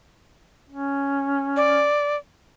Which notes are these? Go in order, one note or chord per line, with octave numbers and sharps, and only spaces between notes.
C#4
D5